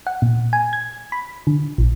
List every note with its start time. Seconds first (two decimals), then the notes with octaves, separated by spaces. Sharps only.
0.07 F#5
0.22 A#2
0.53 G#5
0.73 G#6
1.12 B5
1.47 D3
1.78 A#1